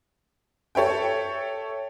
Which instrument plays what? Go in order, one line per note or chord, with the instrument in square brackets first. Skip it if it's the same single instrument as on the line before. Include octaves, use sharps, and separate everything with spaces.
[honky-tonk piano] A4 C#5 E5 G5